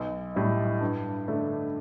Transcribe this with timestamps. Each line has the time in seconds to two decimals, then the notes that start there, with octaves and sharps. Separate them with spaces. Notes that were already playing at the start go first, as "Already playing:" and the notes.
Already playing: B1
0.35 A2 G3 E4
0.81 G2
1.27 D3 A3 D4